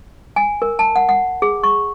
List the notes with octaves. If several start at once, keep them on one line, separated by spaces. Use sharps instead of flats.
G#5
A#4
A5
F#5
F#5
G#4
C#6